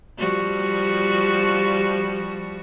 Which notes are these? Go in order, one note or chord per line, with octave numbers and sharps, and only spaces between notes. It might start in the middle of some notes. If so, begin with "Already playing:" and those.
F3 G3 F#4